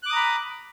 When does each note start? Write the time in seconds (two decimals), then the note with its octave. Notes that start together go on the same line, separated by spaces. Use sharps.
0.03 F#6
0.06 D6
0.09 D#6
0.12 A#5
0.16 B5